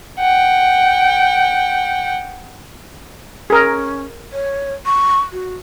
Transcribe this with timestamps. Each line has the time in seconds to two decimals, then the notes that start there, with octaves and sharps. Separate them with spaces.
0.18 F#5 G5
3.50 C#4 G#4 A#4
4.33 C#5
4.86 C#6
5.32 F#4